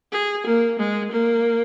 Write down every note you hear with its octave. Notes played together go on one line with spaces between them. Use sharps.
G#4
A#3
G#3
A#3